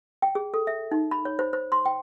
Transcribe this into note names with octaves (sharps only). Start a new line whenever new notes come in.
G5
G#4
A4
E5
D#4
B5
C#5
C5
C5
C6
G5